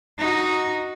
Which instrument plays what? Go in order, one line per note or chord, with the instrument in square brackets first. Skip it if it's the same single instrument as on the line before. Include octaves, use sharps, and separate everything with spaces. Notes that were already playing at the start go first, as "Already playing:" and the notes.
[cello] D#4 F#4